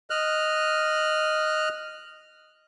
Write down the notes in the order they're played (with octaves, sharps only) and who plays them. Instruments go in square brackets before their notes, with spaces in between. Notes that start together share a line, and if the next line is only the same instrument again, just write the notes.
[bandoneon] D#5 F6 F#6